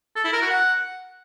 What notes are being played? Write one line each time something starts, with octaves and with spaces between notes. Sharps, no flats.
A4
E4
A#4
F#4
F#5